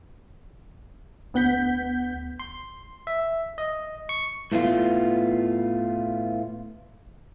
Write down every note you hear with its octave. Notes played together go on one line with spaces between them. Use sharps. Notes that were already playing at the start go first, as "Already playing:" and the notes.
D2 B3 F#5 G6 B6
C6
E5
D#5
C#6
A2 A3 B3 F4